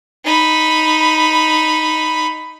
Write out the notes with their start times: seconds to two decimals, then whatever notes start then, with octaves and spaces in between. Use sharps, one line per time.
0.25 D#4 B5